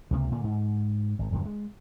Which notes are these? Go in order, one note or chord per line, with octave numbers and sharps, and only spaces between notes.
C#2 C3 A#3
A#2 D3 A#3
G#2
G#1
D#1 G2 D3 F#3
G#3